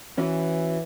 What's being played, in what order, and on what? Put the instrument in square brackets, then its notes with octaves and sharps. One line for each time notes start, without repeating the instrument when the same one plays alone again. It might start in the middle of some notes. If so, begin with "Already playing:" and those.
[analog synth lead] E3 [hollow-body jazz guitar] C#4 F#4 B4